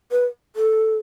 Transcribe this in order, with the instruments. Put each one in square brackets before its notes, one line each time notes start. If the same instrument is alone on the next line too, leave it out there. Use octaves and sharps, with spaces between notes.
[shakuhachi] B4
A4